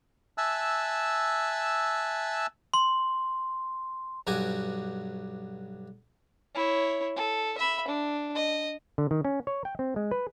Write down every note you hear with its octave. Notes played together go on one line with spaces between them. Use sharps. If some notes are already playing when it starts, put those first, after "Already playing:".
E5 G#5 A5 E6 F#6
C6
B1 G2 F#4 G4 G#5
E4 C#5
A4
E5 B5
D4
D#5
D3
D#3
C#4
C#5
G5
C4
G#3
B4